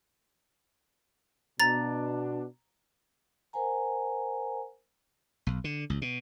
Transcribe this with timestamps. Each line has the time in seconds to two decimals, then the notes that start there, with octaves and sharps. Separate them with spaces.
1.60 B2 D4 A#5 A6
3.53 A#4 C5 F#5 G#5 A#5
5.47 B1
5.64 D3
5.90 C#2
6.02 B2